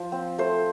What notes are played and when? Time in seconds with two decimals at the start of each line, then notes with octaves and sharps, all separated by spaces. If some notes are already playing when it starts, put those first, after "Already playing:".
Already playing: F3 C5
0.12 C4
0.38 A3 A4 C5